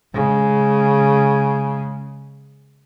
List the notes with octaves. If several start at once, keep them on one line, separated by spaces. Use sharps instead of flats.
C#3 G#3